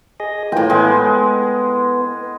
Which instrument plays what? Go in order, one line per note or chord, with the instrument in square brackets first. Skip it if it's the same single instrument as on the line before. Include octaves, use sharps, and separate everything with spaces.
[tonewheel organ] G#4 D#5
[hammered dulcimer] A2 G5 [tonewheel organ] E3 A#3 F4
[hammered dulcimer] G#3 [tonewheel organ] B3